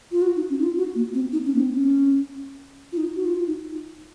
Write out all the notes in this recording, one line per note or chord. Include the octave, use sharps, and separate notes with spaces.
F4
F#4
D#4
C#4
D#4
F4
F#4
A#3
C4
D#4
C#4
A#3
C4
C#4
F4
D#4
F#4
F4
D#4